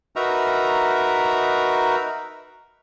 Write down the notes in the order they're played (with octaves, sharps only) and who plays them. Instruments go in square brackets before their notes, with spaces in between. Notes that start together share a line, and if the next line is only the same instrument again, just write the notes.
[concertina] D#4 F#4 A#4 B4 E5 A#5